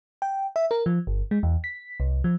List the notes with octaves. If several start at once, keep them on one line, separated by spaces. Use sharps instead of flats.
G5
E5
A#4
F3
G1
G#3
E2
B6
C2
F3